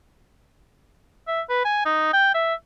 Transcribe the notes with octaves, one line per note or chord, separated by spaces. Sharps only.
E5
B4
G#5
D#4
G5
E5